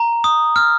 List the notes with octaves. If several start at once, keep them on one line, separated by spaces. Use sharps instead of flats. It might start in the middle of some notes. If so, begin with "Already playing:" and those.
Already playing: A#5
D#6
F6